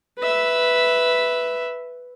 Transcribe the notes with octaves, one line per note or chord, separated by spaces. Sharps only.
B4 E5